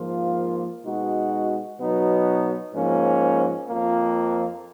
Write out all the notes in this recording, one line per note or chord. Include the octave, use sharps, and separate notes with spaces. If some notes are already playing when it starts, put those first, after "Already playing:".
Already playing: G#2 F3 A#3 F4
B2 G#3 D#4 F#4
B2 F#3 B3 D#4
G#2 F3 A#3 C#4
F2 F3 A#3